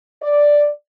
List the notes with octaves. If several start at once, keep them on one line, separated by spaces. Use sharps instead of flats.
D5